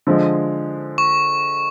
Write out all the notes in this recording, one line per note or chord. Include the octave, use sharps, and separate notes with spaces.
D3 F3 G#3
C#6